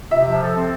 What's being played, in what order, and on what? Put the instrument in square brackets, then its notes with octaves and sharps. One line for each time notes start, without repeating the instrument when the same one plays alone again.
[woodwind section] C3 [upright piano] E5
[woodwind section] F3
A4
C4